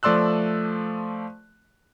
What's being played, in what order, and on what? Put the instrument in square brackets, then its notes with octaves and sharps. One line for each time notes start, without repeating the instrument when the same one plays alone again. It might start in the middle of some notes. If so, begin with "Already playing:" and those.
[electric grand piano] F3 A3 D5 C6 E6 F#6